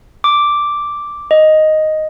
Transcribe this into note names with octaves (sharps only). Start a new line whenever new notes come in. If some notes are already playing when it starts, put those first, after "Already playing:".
D6
D#5